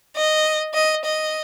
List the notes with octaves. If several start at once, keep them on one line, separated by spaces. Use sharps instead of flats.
D#5
D#5
D#5